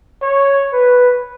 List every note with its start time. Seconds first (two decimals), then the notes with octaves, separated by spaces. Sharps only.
0.22 C#5
0.73 B4